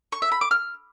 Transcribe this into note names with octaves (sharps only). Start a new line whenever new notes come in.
C#6
E5
B5
D6
F6